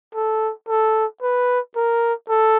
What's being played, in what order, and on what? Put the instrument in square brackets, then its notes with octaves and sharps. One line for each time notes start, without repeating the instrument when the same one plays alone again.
[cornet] A4
A4
B4
A#4
A4